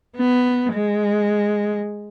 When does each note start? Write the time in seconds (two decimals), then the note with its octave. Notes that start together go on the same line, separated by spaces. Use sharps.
0.16 B3
0.73 G#3